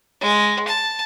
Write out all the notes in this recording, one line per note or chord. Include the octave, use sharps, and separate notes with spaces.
G#3
A5